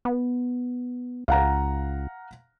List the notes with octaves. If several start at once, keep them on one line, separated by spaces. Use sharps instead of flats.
B3
C#2 F5 F#5 A#5